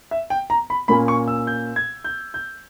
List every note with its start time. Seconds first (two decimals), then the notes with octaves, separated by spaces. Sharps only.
0.11 E5
0.30 G5
0.50 A#5
0.70 B5
0.88 A#2 A#3 C#4 B5
1.08 C#6
1.28 E6
1.47 G6
1.76 G#6
2.04 G6
2.34 G6